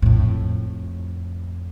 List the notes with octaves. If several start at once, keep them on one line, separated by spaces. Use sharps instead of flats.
F2 A2